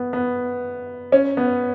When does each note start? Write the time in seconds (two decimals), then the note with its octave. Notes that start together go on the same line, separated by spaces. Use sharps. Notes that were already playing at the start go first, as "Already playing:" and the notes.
Already playing: B3
0.13 B3
1.12 C#4
1.37 B3